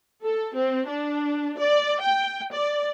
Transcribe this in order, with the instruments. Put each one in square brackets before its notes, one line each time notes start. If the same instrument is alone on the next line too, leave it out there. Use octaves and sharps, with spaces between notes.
[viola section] A4
C4
D4
D5
G5
D5